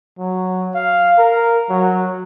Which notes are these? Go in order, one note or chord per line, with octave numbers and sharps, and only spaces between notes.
F#3
F5
A#4
F#3